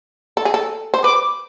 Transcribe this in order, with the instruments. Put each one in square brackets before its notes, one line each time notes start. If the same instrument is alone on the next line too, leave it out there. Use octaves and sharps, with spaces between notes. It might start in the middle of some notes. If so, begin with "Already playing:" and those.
[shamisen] A4
G#4
A4
C5
[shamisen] B4 [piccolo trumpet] D6